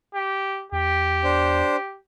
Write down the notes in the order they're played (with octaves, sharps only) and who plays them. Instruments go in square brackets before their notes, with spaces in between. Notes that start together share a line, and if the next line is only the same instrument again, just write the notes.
[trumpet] G4
[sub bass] E2 [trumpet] G4
[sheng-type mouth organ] D4 C5